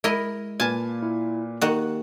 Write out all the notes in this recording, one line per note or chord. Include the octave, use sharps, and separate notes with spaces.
G#3 E4 A#4 D#5
A#2 B4 G#5 A5 F6
E4
D#3 A#3 F#4 G4 F#5